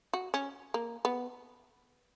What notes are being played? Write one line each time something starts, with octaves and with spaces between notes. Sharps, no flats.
F#4
C#4
A#3
B3